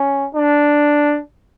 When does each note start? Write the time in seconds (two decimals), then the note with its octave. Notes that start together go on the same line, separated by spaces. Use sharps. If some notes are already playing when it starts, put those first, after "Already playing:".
Already playing: C#4
0.35 D4